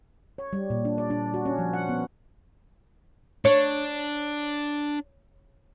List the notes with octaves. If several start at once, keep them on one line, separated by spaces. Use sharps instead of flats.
C#5
G3
A#2
D4
D5
D4
F#4
C#4
F3
F#5
B3
D4 C#5